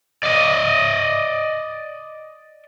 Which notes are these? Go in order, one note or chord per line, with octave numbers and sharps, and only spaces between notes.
D5 D#5